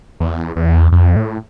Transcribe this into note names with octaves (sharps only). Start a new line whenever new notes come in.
E2
E2
F2
A2